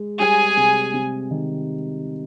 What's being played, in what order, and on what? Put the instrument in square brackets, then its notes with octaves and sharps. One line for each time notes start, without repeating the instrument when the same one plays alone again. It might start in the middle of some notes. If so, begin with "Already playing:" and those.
Already playing: [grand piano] G#3
[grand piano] G3 [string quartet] G#4 G#5
[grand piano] C3
C3
D#3